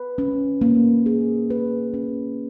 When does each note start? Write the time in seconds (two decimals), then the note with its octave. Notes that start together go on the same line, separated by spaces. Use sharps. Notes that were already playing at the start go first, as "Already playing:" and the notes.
Already playing: B4
0.18 C#4
0.61 A#3
1.06 G#4
1.50 B4
1.94 C#4